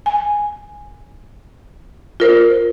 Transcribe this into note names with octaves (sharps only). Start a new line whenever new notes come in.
G#5
F4 A#4 C5